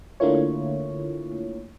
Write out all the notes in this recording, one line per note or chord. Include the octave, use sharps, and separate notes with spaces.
D3 A3 A#3 E4 F4 C#5